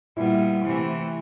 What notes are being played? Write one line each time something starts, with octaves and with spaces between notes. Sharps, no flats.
A#2 G3 B3 E4
C3 E3 A3